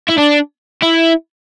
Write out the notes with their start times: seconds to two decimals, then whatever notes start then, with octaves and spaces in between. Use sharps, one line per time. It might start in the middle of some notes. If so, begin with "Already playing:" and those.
0.09 E4
0.18 D4
0.83 E4